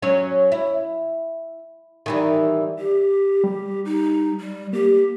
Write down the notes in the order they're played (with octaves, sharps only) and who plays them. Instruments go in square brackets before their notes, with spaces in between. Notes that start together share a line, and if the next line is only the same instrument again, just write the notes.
[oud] F#3 C#4 C#5
E4
D#3 E3 G3
[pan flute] G4
[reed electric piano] G3
[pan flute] D#4
G3
[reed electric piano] A#3 [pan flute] G4